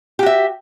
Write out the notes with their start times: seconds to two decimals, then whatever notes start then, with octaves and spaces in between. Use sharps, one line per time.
0.19 G4
0.23 F#4
0.26 E5